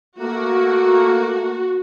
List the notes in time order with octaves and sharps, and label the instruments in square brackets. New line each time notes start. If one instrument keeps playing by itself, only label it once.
[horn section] A3 A#3 [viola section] F#4